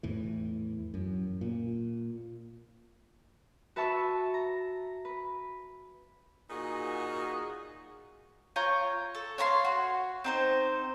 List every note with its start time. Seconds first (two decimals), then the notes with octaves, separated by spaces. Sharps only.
0.03 E2 A2 E3
0.94 F#2
1.41 A#2
3.76 F#4 B4 E5 A5 C#6 E6
4.34 A#5
5.05 B4
6.50 A#2 D#4 F#4 G#4
8.56 F4 C#5 G5 A#5
9.15 A4
9.38 C#5 F5 A#5 C6
9.65 F#4
10.24 C4 D#4 C5